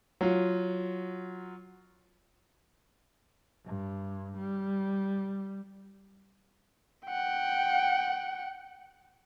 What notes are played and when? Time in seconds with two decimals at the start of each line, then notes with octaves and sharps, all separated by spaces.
0.21 F#3 F4
3.66 G2
4.38 G3
7.07 F#5 G5